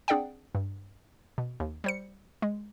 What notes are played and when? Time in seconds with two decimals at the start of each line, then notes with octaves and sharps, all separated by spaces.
0.08 C4 D4 G#4 D5 F#5 G5
0.55 G2
1.38 B2
1.60 D#2
1.84 G3 C5 C#7
2.42 G#3